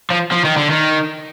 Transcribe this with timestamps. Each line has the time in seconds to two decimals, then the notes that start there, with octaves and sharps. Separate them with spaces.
0.11 F3
0.32 F3
0.45 D#3
0.57 D3
0.70 D#3